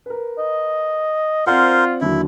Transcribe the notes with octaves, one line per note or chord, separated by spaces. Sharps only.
A#4 B4
D#5
C4 F4 A#4 C5 D5 F#5
D#2 D3 F#3 E4